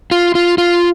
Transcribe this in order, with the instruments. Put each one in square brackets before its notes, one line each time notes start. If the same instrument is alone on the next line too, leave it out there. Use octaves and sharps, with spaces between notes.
[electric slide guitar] F4
F4
F4